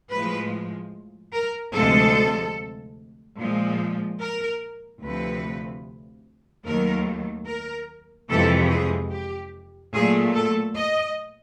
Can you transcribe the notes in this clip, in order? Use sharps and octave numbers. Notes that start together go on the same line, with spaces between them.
A2 F3 G#3 B4
A#4
D2 C3 F3 G#3 A4
A#2 F3 G#3
A#4
D2 C3 F3 A3 B4
D#2 D#3 F#3 A3 A#4
A#4
F2 C3 E3 G#3 A4
G#4
G4
A#2 F#3 A3 G#4
A4
D#5